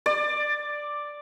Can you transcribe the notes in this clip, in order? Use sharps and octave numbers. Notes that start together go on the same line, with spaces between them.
D5